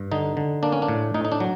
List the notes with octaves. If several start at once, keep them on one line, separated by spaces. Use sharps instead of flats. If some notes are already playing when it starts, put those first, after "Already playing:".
Already playing: G2
D3 D#4
D3
A#3 D4
C#4
D4
A2
A2 D#4
D#4
D4
F#3